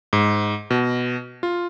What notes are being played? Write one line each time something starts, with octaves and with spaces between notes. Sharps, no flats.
G#2
B2
F4